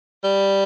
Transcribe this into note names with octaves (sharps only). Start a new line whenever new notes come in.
G3